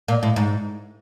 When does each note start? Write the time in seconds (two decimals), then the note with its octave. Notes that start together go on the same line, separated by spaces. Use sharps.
0.08 A#2
0.23 A2
0.36 G#2